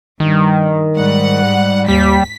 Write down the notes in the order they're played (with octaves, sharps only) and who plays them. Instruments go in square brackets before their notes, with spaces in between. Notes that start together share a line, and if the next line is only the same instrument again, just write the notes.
[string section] G2 [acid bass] D#3
[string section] G#2 F#5 [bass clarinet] G3
[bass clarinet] D#2 [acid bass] G3 [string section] B6